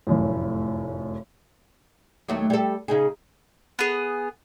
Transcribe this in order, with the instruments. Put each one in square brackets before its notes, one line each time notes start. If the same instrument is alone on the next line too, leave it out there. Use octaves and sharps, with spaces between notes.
[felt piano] F1 F#2 A2
[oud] D#2 F#3 A3
G3 A4
C#3 D#4 G#4
[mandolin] B3 G#4